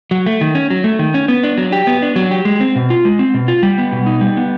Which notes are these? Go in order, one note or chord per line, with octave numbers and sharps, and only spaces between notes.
F#3
A3
D#3
C#4
F#3
A3
D#3
C#4
B3
D4
F#3
G4
B3
D4
F#3
G4
G#3
C4
B2
F4
G#3
C4
B2
F4
G3
B3
B2
D#4
G3
B3